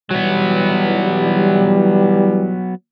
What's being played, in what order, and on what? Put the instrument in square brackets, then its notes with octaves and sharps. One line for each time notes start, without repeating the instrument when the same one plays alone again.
[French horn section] E3 G3 [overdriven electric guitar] F#3 B3